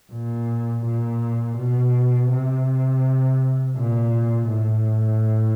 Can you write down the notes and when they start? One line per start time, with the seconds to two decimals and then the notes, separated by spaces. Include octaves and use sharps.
0.12 A#2
0.86 A#2
1.57 B2
2.31 C3
3.76 A#2
4.49 A2